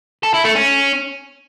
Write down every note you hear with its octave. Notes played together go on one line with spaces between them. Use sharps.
A4
E4
A3
C#4